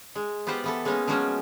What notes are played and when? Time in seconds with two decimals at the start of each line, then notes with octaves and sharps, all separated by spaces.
0.15 G#3
0.47 B3 F4 G4 C5 F#5
0.64 E3 B3 A4
0.85 G#3 A#3 B3 C#4 D#4
1.07 F3 F#3 G#3 C#4 F4 F#4